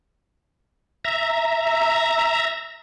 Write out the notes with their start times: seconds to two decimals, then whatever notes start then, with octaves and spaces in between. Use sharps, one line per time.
1.05 E5 A#5